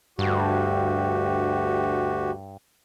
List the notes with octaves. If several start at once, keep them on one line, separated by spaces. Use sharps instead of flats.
D2 G2 F#4 G4